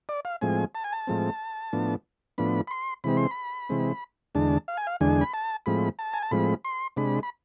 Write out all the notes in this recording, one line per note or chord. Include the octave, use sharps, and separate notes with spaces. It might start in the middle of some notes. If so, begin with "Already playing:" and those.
D5
F5
A2 F3 G#3 C4 G#5
A5
G#5
A5
A2 F3 G#3 C4
A2 F3 B3 D4
A2 F3 B3 D4 B5
B5
C6
C3 E3 G#3 C4 B5
C6
B5
C3 E3 G#3 C4
E2 D3 G#3 D4 A5
F5
G#5
F5
E2 D3 G#3 D4 G#5
B5
A5
A2 F3 G#3 C4 B5
A5
G#5
A5
A2 F3 G#3 C4 B5
C6
C3 G#3 D4 B5
B5